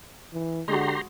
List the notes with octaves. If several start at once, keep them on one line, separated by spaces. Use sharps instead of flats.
E3
D3 G#3 F#4 G4 A#5 C6